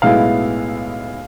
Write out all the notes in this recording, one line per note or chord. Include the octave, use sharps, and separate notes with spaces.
B1 A2 G#3 B3 E4 F5